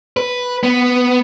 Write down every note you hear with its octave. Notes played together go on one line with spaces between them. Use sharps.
B4
B3